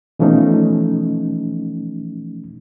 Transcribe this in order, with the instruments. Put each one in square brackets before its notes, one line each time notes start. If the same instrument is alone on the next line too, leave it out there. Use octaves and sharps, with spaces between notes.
[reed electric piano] B2 E3 F3 A3 C#4 D#4